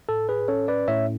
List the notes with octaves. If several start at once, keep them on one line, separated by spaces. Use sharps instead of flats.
A2 A4
G#4 B4
C#4 A4 C#5
B4 D5
A2 C#5 E5